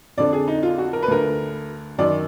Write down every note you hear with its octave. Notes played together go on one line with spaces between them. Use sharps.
F2 D3 D5
G#4
D#4
F4
F#4
A#4
B4
D2 D3 A#4
F#2 D#3 D5